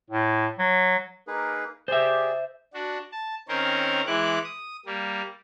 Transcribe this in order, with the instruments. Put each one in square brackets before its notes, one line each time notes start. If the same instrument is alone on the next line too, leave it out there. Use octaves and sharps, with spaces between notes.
[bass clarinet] A2
F#3
[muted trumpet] A#3 [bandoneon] D#4 G#4 B4
[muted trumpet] G4 [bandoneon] G#4 D5 [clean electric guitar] C5 E5
[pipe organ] D4 F#4
A5
D#3 C4 C#4 A#4 C5 C#5
E3 G#3 E4 D6 F#6
D#6
G3 A#3